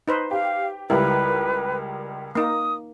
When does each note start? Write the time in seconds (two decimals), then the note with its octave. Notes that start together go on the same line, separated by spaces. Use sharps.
0.08 D#4 B4 C5
0.31 G4 F5
0.90 C#2 G3 E4 A#4 B4
2.35 A#3 D#4 D#6